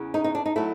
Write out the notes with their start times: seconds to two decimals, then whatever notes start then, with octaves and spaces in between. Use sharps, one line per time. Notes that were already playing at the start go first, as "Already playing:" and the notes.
Already playing: E2 C#3 E3
0.14 D#4
0.24 D#4
0.35 D4
0.46 D#4
0.56 F#3 A3 E4